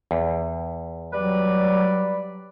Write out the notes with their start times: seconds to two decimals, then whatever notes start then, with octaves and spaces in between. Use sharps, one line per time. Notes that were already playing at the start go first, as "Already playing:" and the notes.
0.11 E2
1.13 F#3 G3 B4 D5